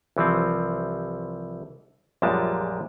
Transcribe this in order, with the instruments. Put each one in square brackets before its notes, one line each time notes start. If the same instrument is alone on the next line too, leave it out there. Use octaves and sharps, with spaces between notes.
[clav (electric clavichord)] C2 E3 F3 C4
A#1 F#2 A#2 G3 G#3 A5